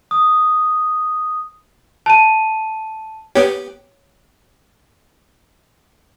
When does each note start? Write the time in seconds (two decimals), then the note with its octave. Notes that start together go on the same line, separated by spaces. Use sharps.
0.11 D#6
2.06 A5 D#7
3.35 B3 G4 C#5